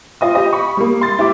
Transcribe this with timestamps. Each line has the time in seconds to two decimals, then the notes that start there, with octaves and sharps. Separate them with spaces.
0.21 F4 D#5 D#6
0.35 G4 D#5
0.53 B5 C#6
0.77 G3 A#3
1.01 C6 A6
1.19 E4 G4 D6